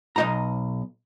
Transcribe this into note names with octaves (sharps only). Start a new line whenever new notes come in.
B1 D#5 A#5